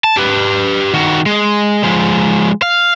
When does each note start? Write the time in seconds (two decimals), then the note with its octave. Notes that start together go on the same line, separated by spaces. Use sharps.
0.04 A5
0.17 G4 B4
0.94 D#3 F#4
1.26 G#3
1.84 F3 G#3
2.62 F5